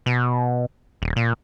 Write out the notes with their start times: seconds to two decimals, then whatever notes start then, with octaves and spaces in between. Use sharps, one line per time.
0.06 B2
1.02 D#1
1.16 A#2